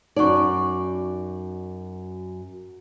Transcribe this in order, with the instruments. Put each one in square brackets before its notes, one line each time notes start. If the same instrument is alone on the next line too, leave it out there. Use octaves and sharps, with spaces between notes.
[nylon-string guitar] F#2 D5 [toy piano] D#4 C#6